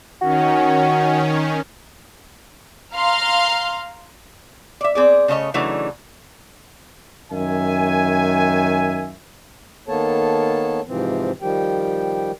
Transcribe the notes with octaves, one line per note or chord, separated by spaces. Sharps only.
D#3 C#4 F#4
F5 A#5 C6 F6
D5 E5
C4 G#4 D5
C#3 A3 C#5 D#5
C#3 E3 F#3 A3 D4 D#4
F#2 D#3 E5 G#5
D#3 A#3 B3 A4 C#5 A5
G#2 C3 E3 F3 C4
D#3 F3 G3 G4 G5